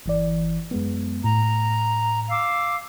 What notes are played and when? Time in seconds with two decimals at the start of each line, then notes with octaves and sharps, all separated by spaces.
0.06 G1 E3 D5
0.71 F#2 G#3 B3
1.24 A2 A#5
2.30 F5 D6 E6